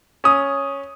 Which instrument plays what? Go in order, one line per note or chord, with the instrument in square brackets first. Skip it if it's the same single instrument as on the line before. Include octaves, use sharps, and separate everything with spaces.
[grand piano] C#4 D#6